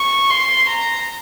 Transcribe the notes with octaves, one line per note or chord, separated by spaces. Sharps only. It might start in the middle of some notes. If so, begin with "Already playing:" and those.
Already playing: C#6
C6
A#5